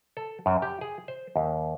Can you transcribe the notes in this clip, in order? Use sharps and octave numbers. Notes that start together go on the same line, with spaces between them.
A4
F#2
G4
G#4
C5
D#2